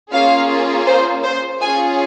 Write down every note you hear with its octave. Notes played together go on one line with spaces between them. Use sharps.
A#3 C#4 F4 G#4 F5
C5
C5
C#4 F4 G#4 G#5